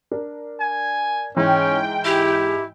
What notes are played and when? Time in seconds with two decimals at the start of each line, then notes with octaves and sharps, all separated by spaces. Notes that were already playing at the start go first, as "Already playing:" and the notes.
0.11 D4 A#4
0.60 G#5
1.37 G#2 E3 C#4 G5
2.05 E4 G4